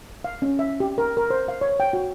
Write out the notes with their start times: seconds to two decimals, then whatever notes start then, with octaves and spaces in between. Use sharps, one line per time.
0.24 F5
0.42 C#4
0.59 E5
0.80 G4
0.98 A#4
1.17 A#4
1.30 C5
1.48 F5
1.61 C#5
1.80 G5
1.93 F#4